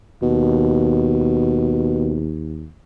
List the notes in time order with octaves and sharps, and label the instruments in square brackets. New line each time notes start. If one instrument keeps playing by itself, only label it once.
[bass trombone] D#2 [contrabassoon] B2